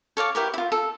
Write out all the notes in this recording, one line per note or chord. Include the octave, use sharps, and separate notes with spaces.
A4 C#5 F5 D6
E4 G4 A#4 B4
E4 F4
A4